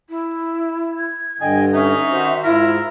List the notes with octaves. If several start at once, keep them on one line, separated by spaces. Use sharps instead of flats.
E4
G#6
G2 D3 D#5 G5 G#5
C#4 D#4 E5
D#3 F#4 C5
G#2 E4 F4 A#4